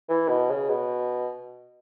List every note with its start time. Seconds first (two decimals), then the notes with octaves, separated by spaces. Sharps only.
0.09 E3
0.28 B2
0.50 C#3
0.69 B2